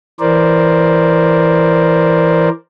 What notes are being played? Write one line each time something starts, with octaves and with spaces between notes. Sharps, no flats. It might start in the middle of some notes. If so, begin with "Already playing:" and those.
E3 A#4 C5 D5